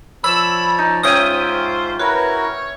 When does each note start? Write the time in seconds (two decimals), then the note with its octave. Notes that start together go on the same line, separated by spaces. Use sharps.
0.24 F3 C#5 D5 B5 E6
0.78 D#4
1.03 G#2 C#4 F4 C5 E5 G5 D#6
1.99 E4 F#4 A#4 B4 C#5